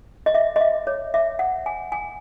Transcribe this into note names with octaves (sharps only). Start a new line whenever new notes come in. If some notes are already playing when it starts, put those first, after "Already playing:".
D#5
E5
D#5
E5
C#5
E5
F#5
G#5
G#5